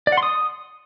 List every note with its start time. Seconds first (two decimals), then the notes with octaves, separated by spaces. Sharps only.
0.07 D5
0.12 F#5
0.17 C6
0.23 D#6